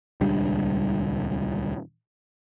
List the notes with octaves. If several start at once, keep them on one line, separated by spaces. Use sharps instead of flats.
D#1 C#2 G3 D4